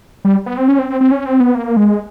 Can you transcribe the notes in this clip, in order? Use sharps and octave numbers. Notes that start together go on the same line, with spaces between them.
G3
B3
C4
C#4
C4
C4
C4
C#4
C4
B3
A#3
G#3